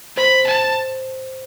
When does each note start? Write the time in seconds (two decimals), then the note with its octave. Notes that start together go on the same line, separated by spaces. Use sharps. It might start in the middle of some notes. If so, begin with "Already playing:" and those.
0.17 C5 B5
0.47 A5